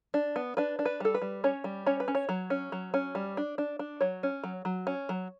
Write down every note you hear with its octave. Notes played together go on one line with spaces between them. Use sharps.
D4
B3
D4 B4
D4
B4
G3 A4
B4
G3
C#4 C#5
G3
C#4 C#5
B4
C#4
C#5
F#3
C#4
F#3
C#4
G3
D4
D4
D4
F#3 C#5
C#4
F#3
F#3
C#4
F#3